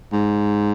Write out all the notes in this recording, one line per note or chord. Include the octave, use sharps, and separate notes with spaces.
G#2